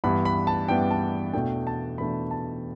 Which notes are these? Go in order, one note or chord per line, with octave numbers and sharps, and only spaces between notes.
G2 E3 B3 D4 B5
B5
A5
G2 E3 B3 D4 G5
A5
E2 B2 A3 D4 G5
A5
E2 B2 A3 D4 B5
A5